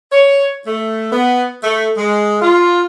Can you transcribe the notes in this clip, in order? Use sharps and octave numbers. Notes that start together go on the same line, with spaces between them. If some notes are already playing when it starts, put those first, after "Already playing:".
C#5
A3
B3
A3
G#3
F4